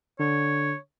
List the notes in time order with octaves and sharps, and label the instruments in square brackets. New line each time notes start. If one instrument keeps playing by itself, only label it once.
[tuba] D3 [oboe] C#5